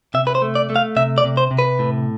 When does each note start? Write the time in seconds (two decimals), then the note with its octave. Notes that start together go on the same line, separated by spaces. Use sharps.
0.14 C3 E5
0.27 B4
0.35 C5
0.42 A3
0.55 D5
0.70 A3
0.76 F5
0.96 C3 E5
1.18 D5
1.24 C3
1.37 C5
1.51 C3
1.59 B4
1.79 A2